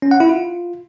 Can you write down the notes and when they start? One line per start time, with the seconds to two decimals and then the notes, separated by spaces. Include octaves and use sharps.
0.02 C#4
0.11 F#5
0.20 E4
0.29 F4